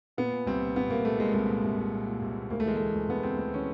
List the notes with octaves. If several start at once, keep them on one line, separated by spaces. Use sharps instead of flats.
A#2 B3
A#2
C2 C4
A#2
A#2 B3
C2 A#3
A#2 A3
A#2 G#3
C2 G#3
A#2
C2
C2
A#2
A#2
C2
A#2
D2 A#3
A3
E3 G#3
E3 A3
D2
D2 B3
D2 C4
D2 C4
E3 C#4